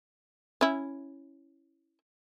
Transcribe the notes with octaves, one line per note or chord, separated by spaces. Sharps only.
C#4 E4